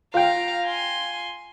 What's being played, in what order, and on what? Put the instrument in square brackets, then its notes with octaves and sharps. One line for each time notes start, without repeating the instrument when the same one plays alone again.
[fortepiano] F4 G5 [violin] F5 A#5
[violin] G#5 C6